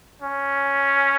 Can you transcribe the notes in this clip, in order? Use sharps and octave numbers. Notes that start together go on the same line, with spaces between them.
C#4